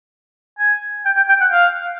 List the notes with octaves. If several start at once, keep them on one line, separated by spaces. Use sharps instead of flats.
G#5
G5
G5
G5
F#5
F5